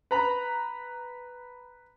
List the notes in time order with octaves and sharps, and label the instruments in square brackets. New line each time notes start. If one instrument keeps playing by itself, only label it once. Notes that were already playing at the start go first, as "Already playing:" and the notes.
[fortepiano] B4 A#5 B5